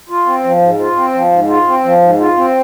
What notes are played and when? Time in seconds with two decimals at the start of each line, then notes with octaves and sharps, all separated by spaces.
0.09 F4
0.26 C4
0.44 F3
0.61 G#2
0.79 F4
0.96 C4
1.14 F3
1.32 G#2
1.49 F4
1.67 C4
1.84 F3
2.02 G#2
2.19 F4
2.37 C4